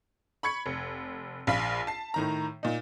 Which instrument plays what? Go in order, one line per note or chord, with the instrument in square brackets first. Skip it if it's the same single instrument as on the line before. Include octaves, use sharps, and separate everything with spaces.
[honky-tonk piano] B5 C#6 G#6 C#7
F1
A#1 F5 B5 B6
A5 C7
A2 D#3 A#5
A#2 D#4